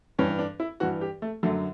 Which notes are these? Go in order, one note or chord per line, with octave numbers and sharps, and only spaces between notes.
G2 E3 C#4
D4
E4
G2 E3 F#4
G4
A3
F#2 D3 F#3 A3